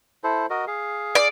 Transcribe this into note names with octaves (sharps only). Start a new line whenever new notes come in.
E4 A4 C5
F#4 A#4 D#5
G#4 F5
D5